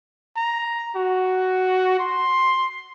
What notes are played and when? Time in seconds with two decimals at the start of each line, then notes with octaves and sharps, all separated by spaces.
0.36 A#5
0.96 F#4
1.99 C6